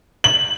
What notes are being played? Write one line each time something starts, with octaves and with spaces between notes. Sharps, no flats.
F#7